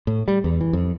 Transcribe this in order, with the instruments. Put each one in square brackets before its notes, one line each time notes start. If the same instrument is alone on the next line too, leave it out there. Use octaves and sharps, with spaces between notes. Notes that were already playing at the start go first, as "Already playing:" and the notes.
[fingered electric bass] A2
G3
E2
E3
F2